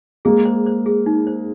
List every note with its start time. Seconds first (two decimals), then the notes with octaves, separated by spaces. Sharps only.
0.25 G#3 A#3 G#4
0.45 C5
0.66 C5
0.86 G#4
1.06 D#4
1.27 C5